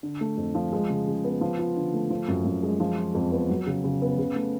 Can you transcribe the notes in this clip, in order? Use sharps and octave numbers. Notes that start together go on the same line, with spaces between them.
D3
A3
F2
F3
G#3
C#3
C#3
B3
F3
F4
D3
A3
F3
F#2
F#2
G#3
F3
F4
F2
B3
F#3
C#3
C#3
B3
C#3
A3